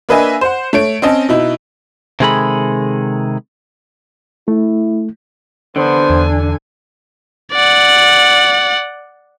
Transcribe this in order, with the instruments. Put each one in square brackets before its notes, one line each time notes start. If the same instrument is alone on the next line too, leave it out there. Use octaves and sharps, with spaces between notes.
[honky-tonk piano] A#3 D4 B4 D#5 E5 G#5
C5 F#5
A3 C#5 D7
C4 C#4 D#5 A5
B2 D#4 E4
[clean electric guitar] C3 D#3 G#3 G#4 A4 B5
[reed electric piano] A3 [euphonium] E4
[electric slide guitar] D3 [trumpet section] B3 C5 [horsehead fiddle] D4 G#5
[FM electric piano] E2
[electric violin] D5 F#5